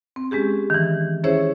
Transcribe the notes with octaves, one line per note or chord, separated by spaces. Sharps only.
C4
G#3 C#4 G4 G#4
D#3 E3
C#4 E4 G#4 C5 C#5 E5